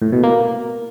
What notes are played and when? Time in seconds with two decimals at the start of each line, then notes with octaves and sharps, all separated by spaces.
0.02 A2
0.12 B2
0.23 A#3